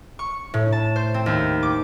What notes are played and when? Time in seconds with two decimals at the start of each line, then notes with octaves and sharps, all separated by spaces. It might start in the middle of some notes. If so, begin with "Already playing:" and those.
0.19 C#6
0.54 A2
0.72 A5
0.96 C5
1.14 C4
1.26 D#2
1.63 D6